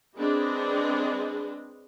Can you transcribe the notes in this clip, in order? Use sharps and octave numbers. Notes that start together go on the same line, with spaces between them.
G#3 C4 D4 G#4 B4 D#5